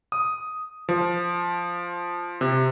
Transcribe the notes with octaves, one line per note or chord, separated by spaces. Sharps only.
D#6
F3
C3